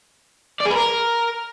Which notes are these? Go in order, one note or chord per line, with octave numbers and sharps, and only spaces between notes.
D5
G#4
B4
A#4